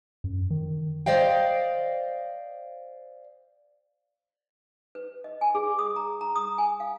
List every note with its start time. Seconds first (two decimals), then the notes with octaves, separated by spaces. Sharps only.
0.24 F#2
0.51 D#3
1.06 C5 D5 D#5 F5 G5
4.95 B4
5.24 D#5
5.41 G#5
5.55 G#4
5.79 D#6
5.96 A#5
6.21 A#5
6.36 D#6
6.58 G#5
6.80 F5